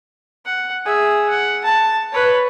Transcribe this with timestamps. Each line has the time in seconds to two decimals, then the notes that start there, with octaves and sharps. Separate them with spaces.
0.45 F#5
0.85 G#4 E5
1.30 F#5
1.64 A5
2.12 B4 C#5